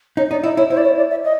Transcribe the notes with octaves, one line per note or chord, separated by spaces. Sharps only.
D#4 C#5
D#4 D5
E4 D#5
E4 C#5
E4 C5
D5
C#5
D5
E5
D#5